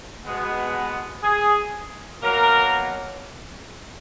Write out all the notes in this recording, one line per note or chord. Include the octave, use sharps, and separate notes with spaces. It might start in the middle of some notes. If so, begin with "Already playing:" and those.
B2 G#3 B3
G#4
B2 F#3 A#3 A#4